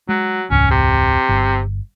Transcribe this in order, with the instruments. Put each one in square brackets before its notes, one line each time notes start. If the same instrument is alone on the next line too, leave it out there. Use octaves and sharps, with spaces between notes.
[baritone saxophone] F#3 [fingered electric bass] G#3
[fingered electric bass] E1 C#2 G#2 [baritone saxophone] C#4
[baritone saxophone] C3
[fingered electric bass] G1